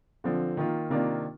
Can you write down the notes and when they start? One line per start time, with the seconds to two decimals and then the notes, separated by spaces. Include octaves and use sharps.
0.24 D3 F3 C4
0.57 D#3 A#3 F4
0.90 C3 D#3 A#3 D4 F4